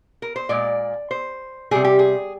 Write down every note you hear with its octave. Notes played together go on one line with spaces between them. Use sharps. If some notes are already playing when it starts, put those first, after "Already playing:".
A#4
C5
A#2 G#3 D5
C5
C3 G3 G#4
G4
G#4